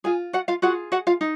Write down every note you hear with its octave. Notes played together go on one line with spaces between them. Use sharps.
F4 G#4 G#5
F#4 F#5
F4 F5
F4 F#4 G#4 F#5
F#4 F#5
F4 F5
D#4